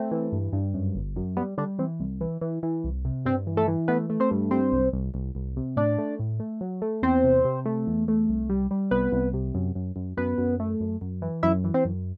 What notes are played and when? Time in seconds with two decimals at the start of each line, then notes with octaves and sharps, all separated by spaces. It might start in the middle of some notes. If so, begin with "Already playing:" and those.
Already playing: A3 C4
0.11 E3
0.32 G2
0.53 G2
0.74 F#2
0.95 G1
1.16 F#2
1.36 G3 B3
1.58 D3 G3 D4
1.79 E3 C4
2.00 C2
2.21 E3
2.41 E3
2.63 E3
2.84 C2
3.05 C3
3.25 G2 C4
3.47 E3
3.57 A3 A4
3.68 E3
3.88 A3 B3 B4
4.10 A3
4.20 C4 C5
4.31 G2
4.51 G3 C4 C5
4.72 C2
4.93 C2
5.14 C2
5.35 C2
5.57 C3
5.77 A2 D4 D5
5.98 A3
6.19 A2
6.40 A3
6.61 F#3
6.82 A3
7.02 E2 C4 C5
7.24 C3
7.45 C3
7.65 A3
7.87 E2
8.08 A3
8.29 C2
8.50 G3
8.71 G3
8.91 C2 B3 B4
9.12 C2
9.33 C3
9.54 F#2
9.75 F#2
9.96 F#2
10.17 F#2 B3 B4
10.38 F#2
10.60 A3
10.80 F#2
11.01 F#2
11.22 E3
11.43 F#2 E4 E5
11.64 E3
11.74 C4 C5
11.85 F#2